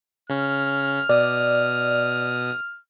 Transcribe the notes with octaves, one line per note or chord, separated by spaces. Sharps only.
C#3 C#4 F6
B2 D5 D#6